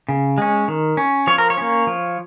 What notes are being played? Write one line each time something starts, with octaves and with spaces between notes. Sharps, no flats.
C#3
G#3 C#4
D#3
C#4
F3 C#5
A#4
C#5
A#3 C#4
F3